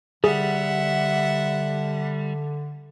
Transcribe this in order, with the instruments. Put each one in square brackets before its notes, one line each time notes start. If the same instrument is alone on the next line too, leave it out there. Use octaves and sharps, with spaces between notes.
[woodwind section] D3 [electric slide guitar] G3 [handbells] G#4 [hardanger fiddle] E5 F#5